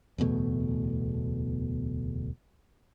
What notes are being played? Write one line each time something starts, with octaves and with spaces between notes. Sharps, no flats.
D1 E2 B2 A3